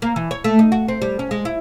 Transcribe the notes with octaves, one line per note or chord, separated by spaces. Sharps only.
A#3
E3
C#5
A3
D#4
F#4
C4
G3
C#4
G#3
E4